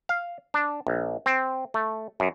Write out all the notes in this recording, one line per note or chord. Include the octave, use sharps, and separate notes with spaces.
F5
D4
A#1
C4
A3
F#2